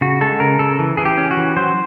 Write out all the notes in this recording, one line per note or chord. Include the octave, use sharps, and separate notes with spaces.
C#3 F#4
G#3 A4
C#3 A#4
C#3 A4
E3
E3 G#4
G4
C#4
F#4
E3
F#3 C5